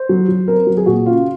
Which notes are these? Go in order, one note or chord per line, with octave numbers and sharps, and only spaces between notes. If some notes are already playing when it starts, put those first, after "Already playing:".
Already playing: C5
F#3
F#3
C4 A#4
F#3
G#4
A#2 F#4
C#3 F4